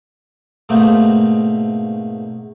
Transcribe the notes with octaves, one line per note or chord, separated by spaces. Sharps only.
G#2 B2 A3 A#3 C4 D#4